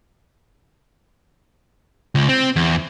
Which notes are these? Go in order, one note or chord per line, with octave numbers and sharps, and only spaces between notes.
C#2
C4
E2